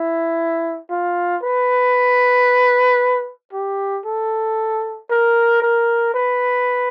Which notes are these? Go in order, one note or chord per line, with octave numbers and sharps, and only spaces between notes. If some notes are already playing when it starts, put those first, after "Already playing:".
Already playing: E4
F4
B4
G4
A4
A#4
A#4
B4